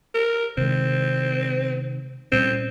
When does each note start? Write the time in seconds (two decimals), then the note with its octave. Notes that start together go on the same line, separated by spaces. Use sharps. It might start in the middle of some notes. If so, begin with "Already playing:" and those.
0.15 A#4
0.57 C3 D#3 G#3 C4
2.32 A#2 G3 C4 C#4